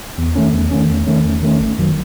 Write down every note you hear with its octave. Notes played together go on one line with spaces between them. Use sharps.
E2
D#3 A3 C#4
E2
D#3 A3 C#4
E2
D#3 A3 C#4
E2
D#3 A3 C#4
G#1
F#2 D#3 F#3